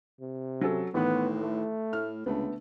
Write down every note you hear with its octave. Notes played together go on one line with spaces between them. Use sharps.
C3
F#3 C#4 A4
A1 A2 D#3 B3 F#6
A3
A2 F6
C#2 D3 A3 B3